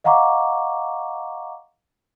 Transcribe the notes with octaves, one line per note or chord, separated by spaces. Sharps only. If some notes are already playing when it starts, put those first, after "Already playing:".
D#5 F5 F#5 A#5 C#6 D6